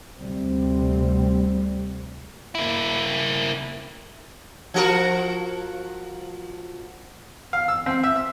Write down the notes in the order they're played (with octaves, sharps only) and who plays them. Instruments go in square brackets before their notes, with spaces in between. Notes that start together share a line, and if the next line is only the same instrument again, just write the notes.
[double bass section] D2 C3 G3 C4
[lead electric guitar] A#3 E4
[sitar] F3 F#4 A#4
[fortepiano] F5
E6
C4
E5
E6